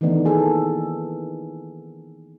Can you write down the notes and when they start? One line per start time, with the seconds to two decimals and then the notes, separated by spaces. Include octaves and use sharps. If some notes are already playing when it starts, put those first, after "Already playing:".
0.01 D#3 E3 A3 B3 D4 D#4
0.25 A#3 G#4 A4